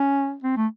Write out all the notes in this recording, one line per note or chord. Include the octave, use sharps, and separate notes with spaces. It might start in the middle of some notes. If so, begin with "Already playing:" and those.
Already playing: C#4
C4
A3